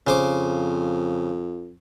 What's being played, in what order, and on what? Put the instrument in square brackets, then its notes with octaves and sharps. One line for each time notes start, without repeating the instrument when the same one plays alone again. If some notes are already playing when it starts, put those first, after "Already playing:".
[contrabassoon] F2 [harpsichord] C#3 C5 D6